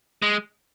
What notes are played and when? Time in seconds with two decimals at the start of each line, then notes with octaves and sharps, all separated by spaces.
0.22 G#3